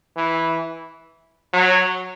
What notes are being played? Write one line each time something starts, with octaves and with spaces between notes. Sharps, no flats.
E3
F#3